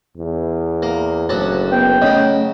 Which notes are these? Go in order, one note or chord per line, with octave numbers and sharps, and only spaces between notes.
E2
A#3
F#1 D2 F#3 A5
B3 G5
C#3 F#3 A3 C#4 D#5